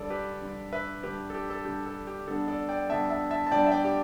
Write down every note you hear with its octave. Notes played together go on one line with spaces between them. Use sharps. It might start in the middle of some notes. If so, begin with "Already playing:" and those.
Already playing: D3 G3 D4 A4 D5
G4 B4
D3 G3 D4
B4 E5
D3 G3 D4 G4 B4
A4
G4
A4
D3 G3 D4 G4
A4
G4
D3 G3 B3 D4 A4
A4 D5
D5 G5
D3 G3 B3 D4 E5 A5
E5 A5
E5 A5
A5
D3 G3 B3 D4 D5 G5
E5
D5 G5
G4